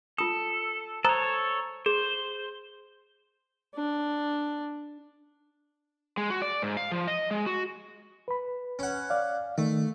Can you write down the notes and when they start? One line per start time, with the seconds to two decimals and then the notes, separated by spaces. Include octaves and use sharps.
0.18 F4 A4 D#6
1.05 A4 C5 C#5 A#5 D#6
1.86 G#4 C5
3.75 D4
6.17 G#3
6.30 F#4
6.42 D5
6.62 G#2
6.77 F5
6.92 F3
7.07 D#5
7.31 G#3
7.46 F#4
8.28 B4 B5
8.79 C#4 F#5
9.10 D5 F5
9.58 D#3 A3